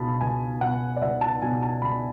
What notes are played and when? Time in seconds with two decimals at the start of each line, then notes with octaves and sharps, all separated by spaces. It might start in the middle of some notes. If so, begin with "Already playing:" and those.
Already playing: C#2 B2 A5 B5
0.21 C#2 G#5
0.61 B2 F#5
0.96 D5
1.01 C#2 E5
1.21 A5
1.42 B2 G#5
1.63 A5
1.82 C#2 B5